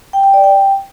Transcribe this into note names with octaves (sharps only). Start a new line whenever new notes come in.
G5
G5
D5
G5